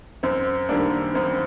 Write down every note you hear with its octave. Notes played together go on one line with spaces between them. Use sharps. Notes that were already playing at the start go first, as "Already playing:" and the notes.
F#2 C4
D#3 G3 A#3 D4
F#2 C4